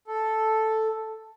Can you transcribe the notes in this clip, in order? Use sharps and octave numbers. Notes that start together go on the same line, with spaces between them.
A4